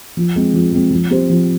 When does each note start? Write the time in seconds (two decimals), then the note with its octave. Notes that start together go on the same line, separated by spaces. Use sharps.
0.17 F3
0.36 G#3 C4
0.54 F3
0.72 G#3 C4
0.91 F3
1.10 C4 G4 C5
1.30 F3